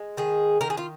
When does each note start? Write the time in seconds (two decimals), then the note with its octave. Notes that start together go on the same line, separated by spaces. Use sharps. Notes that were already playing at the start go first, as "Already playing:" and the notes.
Already playing: G#3
0.17 D#3 G#4
0.61 D#3 A#4
0.70 G#4
0.77 F4